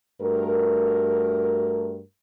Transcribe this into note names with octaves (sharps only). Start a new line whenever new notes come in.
G2 A3 F#4 A#4